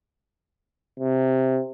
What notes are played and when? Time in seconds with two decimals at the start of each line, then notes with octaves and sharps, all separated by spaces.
1.00 C3